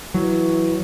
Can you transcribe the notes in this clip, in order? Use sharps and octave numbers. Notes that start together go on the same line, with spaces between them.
E3 F#3